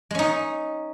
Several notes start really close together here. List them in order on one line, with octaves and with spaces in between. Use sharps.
G#3 C#4 D#4